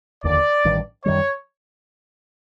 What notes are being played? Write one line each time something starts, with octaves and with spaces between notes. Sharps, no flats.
F1 D#2 D3 D5
A1 G2 D#3
F#2 D#3 G3 C#5